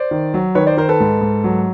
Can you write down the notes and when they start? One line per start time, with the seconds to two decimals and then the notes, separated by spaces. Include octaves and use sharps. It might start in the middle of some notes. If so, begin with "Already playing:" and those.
Already playing: C5 D5
0.11 D#3
0.34 F#3
0.55 D#3 B4 C#5
0.67 C5 D5
0.77 D#3 A#4 C5
0.89 A4 B4
1.00 G#2
1.21 G#2
1.44 F#3